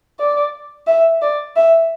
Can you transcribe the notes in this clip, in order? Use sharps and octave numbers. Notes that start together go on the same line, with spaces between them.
D5
E5
D5
E5